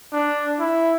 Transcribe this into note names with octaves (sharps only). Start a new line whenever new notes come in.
D4
E4